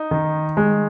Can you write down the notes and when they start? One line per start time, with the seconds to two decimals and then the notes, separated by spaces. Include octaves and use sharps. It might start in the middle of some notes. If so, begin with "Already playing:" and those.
Already playing: D#4
0.11 D#3
0.57 G#3